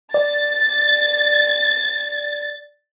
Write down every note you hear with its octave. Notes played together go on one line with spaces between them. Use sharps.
D5 A6